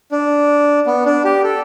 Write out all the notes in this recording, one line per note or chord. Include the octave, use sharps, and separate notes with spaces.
D4
B3
D4
G4
A4